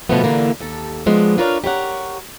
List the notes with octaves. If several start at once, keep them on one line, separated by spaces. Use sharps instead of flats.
B2 D3 F3 G3 A3 B3
D#2 A#2 D3 E3 A#3
D#2 A4
D3 F3 G#3 B3
D4 F4 A#4 B4 C#5 F5
G4 A#4 C#5 F#5